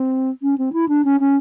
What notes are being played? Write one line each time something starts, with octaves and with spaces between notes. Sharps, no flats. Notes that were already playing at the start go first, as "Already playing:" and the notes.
Already playing: C4
C#4
C4
E4
D4
C#4
C#4